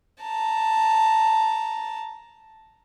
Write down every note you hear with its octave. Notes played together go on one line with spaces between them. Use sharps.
A5 A#5